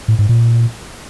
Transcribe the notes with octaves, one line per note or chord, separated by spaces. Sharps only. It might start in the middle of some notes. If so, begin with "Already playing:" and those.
A2
G#2
A#2